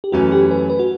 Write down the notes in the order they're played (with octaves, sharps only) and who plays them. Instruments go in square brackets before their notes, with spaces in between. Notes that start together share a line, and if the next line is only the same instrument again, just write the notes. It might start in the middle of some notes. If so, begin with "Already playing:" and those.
[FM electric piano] G4
[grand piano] F#2 E3 A3 C#4 [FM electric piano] F#4
[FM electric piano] G4
B4
B4
F#4